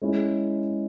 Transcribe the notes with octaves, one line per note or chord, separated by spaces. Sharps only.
G#3 C#4 E4 G#4